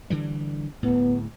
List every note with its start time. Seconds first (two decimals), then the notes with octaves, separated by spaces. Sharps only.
0.10 D3 E3 G3
0.83 D1 A2 B3